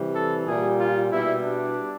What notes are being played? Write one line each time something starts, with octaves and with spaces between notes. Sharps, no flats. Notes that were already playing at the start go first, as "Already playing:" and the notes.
Already playing: C3 E3 G3
A4
A#2 G3 G#4
F4
B2 G3 E4
D4